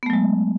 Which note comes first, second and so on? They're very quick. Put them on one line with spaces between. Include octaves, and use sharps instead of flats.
B3 A3 F#3 G#3